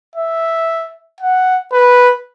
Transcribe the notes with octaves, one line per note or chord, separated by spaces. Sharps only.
E5
F#5
B4